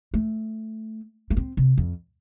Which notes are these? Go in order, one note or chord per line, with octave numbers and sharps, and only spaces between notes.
A3
A3
C4
C3
F2